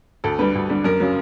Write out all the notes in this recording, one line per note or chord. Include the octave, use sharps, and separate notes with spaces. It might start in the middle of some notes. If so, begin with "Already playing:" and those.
D2 A4
D3 G3 B4
D2
D3 G3
F#2 A#4
C#3 F#3